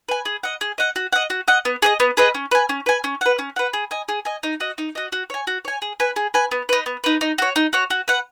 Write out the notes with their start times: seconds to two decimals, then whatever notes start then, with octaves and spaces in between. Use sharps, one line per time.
0.09 B4 G#5
0.25 G#4
0.43 D#5 F#5
0.61 G#4
0.78 D#5 F#5
0.96 F#4
1.13 D#5 F#5
1.30 F#4
1.48 D#5 F#5
1.65 B3
1.82 G#4 B4 D#5
2.00 B3
2.17 G#4 B4 D#5
2.35 C#4
2.51 B4 G#5
2.69 C#4
2.86 B4 G#5
3.04 C#4
3.21 B4 F#5
3.39 C#4
3.56 B4 F#5
3.73 G#4
3.91 D#5 G#5
4.09 G#4
4.25 D#5 G#5
4.43 D#4
4.60 F#4 D#5
4.78 D#4
4.95 F#4 D#5
5.12 F#4
5.30 C#5 G#5
5.47 F#4
5.65 C#5 G#5
5.82 G#4
6.00 B4 G#5
6.16 G#4
6.34 B4 G#5
6.51 B3
6.69 D#4 B4
6.86 B3
7.04 D#4 B4
7.21 D#4
7.38 F#4 C#5
7.56 D#4
7.73 F#4 C#5
7.90 F#4
8.08 B4 F#5